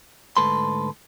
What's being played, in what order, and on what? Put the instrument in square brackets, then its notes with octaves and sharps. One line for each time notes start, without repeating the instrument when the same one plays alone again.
[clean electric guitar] D2 G#2 A4 B4 C6